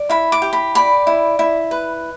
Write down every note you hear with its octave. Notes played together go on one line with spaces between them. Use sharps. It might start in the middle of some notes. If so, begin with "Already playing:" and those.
Already playing: D5
E4 B5
D6
G4
B5
D5 B5
E4
E4
B4